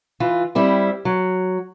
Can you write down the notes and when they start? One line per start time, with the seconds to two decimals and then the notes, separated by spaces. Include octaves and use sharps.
0.20 E3 F4
0.55 G3 C4 E4
1.05 F#3